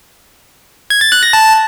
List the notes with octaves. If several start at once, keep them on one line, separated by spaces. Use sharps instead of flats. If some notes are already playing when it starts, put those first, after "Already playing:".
G#6
A6
F#6
A#6
A5